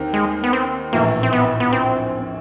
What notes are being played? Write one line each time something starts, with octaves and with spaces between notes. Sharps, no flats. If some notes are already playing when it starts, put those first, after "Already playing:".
Already playing: D#2 D#3 C4
G#3
B3
C4
A#1 A2 E3 A#3
C4
B3
B3
C4